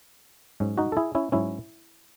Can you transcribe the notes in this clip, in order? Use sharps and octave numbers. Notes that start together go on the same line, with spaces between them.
G#2 F#3 C#4
D#4 F#4
A4
E4 G#4
C#4 E4
G#2 F#3 C#4 E4